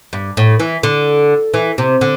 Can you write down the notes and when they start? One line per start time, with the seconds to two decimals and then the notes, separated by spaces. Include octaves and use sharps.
0.13 G2
0.37 A2
0.60 E3
0.83 D3
1.54 E3
1.78 C3
2.01 D3